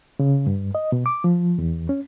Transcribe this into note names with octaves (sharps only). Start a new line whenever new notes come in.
C#3
G2
D#5
B2
D6
F3
E2
C#4